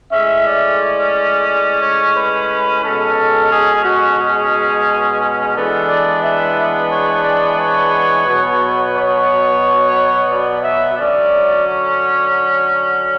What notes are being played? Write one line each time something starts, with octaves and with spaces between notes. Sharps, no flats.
A2 G#3 C#4 E5
D5
D5
C#5
B4
B2 G#3 C#4 A4
G#4
F#4
G#4
E3 G#3 B3 D4 A4
D5
E5
C#5
D5
C#5
B2 F#3 B3
C#5
D5
E5
D3 F#3 C#4 D5
C#5